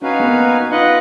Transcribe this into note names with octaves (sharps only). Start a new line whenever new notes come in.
C#4 D#4 F#4 B4 F5 G#5
B3
A#3
D#4 F4 B4 D#5 F#5